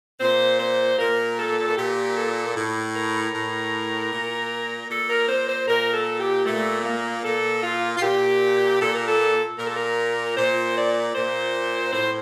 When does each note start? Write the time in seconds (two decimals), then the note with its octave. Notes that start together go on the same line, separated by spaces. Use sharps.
0.21 A#2 C5
0.60 C5
0.99 A#2 A#4
1.38 A4
1.67 A4
1.77 A#2 G4
2.16 A4
2.55 A2
2.95 A#4
3.34 A2
4.12 A#2
4.90 A#2 A4
5.09 A#4
5.29 C5
5.48 C5
5.68 A#2 A#4
5.94 A4
6.20 G4
6.46 A#2 A3
6.80 A3
6.86 A#3
7.24 A#2 A4
7.63 F4
7.96 F4
8.02 A#2 G4
8.81 A#2 A4
8.95 A#4
9.08 A4
9.59 A#2 A#4
9.67 A4
9.76 A#4
10.37 A#2 C5
10.76 D5
11.15 A#2 C5
11.93 A2 C5